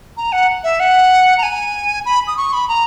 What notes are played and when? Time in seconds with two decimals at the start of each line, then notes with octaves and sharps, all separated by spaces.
0.17 A#5
0.32 F#5
0.64 E5
0.80 F#5
1.38 A#5
1.43 G#5
2.05 B5
2.27 D#6
2.37 C#6
2.53 B5
2.69 A#5